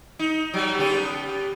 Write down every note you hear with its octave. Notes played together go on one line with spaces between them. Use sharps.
D#4
F#3 G3
C#3 B3 G4